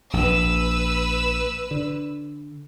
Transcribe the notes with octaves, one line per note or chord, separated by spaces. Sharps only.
A#1 B4 E6
D3